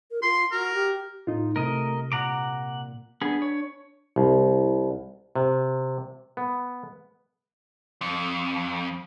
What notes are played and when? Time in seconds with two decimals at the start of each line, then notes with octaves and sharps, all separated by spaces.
0.11 A#4
0.22 F4 C6
0.51 F#4 A#4
0.74 G4
1.27 A2 D#4 F4
1.56 C2 C3 A3 A#4 D#5
2.12 A#2 F#5 A#5 D6
3.21 B3 D4 G#4
3.42 C#5
4.16 C2
5.36 C3
6.37 B3
8.01 F2